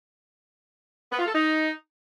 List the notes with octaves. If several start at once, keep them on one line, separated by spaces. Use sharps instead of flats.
B3
F4
A4
D#4